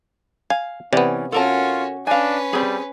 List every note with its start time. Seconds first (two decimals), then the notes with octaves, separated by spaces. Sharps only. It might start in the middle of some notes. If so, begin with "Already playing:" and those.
0.50 F5 G#5
0.93 C3 E3 B3 C#4 D5
1.32 C#4 F4 F#4 A4 A#4 A5
2.07 C#4 D4 B4 F5 G#5
2.53 G3 C4 G#4